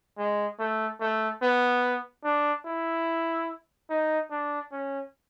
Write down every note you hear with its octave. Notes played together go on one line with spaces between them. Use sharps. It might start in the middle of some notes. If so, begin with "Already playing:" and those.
G#3
A3
A3
B3
D4
E4
D#4
D4
C#4